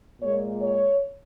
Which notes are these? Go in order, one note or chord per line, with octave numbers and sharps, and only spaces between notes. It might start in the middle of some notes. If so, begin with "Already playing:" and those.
A#2 G#3 C#5
C#5